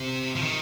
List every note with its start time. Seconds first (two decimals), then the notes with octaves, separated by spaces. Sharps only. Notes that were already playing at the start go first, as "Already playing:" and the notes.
Already playing: C3
0.36 F3
0.42 D#3